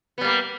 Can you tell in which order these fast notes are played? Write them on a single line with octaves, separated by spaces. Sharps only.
B3 G3 A#3